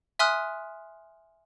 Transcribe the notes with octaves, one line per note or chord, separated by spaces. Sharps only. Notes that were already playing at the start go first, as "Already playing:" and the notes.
E5 G#5 C6 D#6 F6 F#6